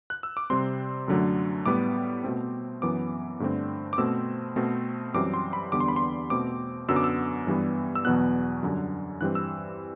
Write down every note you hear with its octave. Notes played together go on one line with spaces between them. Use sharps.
F#6
E6
D6
C3 G3 C4 C6
F#2 D3 F#3 A3
A2 G3 B3 D6
B2 A3 C4
F#2 E3 B3 D6
G2 D3 A3 C4
D6
B2 A3 C4 E6
B2 A3 C4
F#2 E3 G3 C4 D6
C6
B5
E2 D3 G3 B3 D6
C6
B5
C6
B2 A3 C4 D6
F#2 D3 F#3 B3 E6
D6
E6
G2 E3 G3 B3
E6
E2 B2 F#3 B3 F#6
F#2 D3 G3
G2 E3 G3 C4 F#6
E6